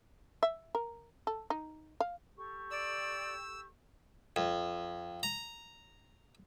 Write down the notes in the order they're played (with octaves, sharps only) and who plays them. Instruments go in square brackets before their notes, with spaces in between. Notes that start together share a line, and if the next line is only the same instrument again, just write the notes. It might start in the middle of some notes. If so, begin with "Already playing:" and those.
[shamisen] E5
A#4
A4
D#4
F5
[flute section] G4 A4 C#6
[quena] D5 [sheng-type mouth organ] E6
[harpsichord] F2
A#5